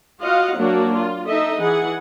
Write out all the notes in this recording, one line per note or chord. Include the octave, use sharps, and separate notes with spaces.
F4 F#4 D#5 F5 F#5
F#3 A#3 D4 F#4
F4
D#4 A4 D#5 E5
E3 G#4 F#5